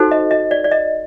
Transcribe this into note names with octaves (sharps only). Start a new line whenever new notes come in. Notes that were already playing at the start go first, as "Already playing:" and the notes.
Already playing: D#4 F#4 A4 C5
D#5
D#5
D5
D5
D#5